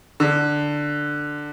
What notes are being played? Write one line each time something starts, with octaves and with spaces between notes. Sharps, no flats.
D3